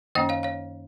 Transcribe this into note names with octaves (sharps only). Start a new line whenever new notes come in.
F#2 D#3 A#3 C#4 D#5 F#5
C#5 F5
C#5 F5